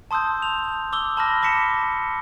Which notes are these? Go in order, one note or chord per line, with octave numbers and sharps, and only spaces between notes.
A5 C6 D#6 E6 G6
F7
D6 E6 G7
A5 B5 F6 A#6
A5 D6 A#6 B6 C#7 E7